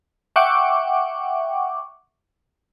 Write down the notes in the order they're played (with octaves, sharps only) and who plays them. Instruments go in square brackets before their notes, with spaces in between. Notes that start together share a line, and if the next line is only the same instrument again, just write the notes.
[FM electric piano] E5 F#5 G5 C#6 D6